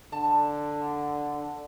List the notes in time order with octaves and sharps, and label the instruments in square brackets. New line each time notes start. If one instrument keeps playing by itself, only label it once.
[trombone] D3 [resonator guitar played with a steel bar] A5